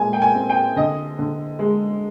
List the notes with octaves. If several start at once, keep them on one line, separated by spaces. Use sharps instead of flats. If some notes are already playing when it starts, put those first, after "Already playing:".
Already playing: A#2 G#3 G#5
G5
G#5
C4
G5
D3 D#5
D3
G#3